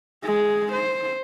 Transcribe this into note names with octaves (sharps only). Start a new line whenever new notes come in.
G#3 G#4
C5